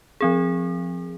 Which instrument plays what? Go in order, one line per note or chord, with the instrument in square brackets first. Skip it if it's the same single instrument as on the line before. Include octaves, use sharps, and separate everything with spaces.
[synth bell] F3 C4 G#4